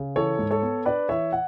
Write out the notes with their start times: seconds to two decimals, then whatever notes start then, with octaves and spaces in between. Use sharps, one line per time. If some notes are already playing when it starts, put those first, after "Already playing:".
Already playing: C#3
0.16 E3 A4 C#5
0.39 G#2
0.51 A4 C#5
0.62 B3
0.86 D4 B4 D5
1.09 E3 C#5 E5
1.32 F#5